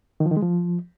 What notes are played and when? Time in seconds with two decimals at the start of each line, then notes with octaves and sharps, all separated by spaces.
0.20 D#3
0.26 F3
0.31 D#3
0.37 G#3
0.42 F3